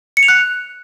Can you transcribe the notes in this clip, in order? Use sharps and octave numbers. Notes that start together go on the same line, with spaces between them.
C#7
F7
F#6